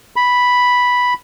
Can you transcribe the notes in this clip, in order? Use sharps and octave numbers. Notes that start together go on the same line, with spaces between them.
B5